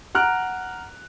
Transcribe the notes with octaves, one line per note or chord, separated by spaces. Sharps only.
F#5 A#5 F6 F#6 D7